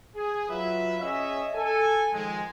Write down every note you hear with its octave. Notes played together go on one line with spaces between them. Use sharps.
G#4
F#3 F4 B4 E5
C#4 G#4 C#5 D#5 E5
A4 G#5
D#3 F3 G#3